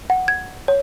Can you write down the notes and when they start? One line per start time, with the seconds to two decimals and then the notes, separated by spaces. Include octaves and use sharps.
0.10 F#5
0.28 G#6
0.68 C#5